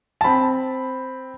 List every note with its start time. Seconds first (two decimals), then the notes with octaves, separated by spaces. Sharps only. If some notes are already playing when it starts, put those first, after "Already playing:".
0.21 A5
0.24 C4 B5